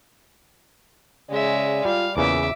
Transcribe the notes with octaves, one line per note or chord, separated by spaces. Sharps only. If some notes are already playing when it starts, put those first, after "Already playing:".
C#3 G#3 D5 E5
G3 F4 F5
E2 A#2 C#3 E3 E5 D6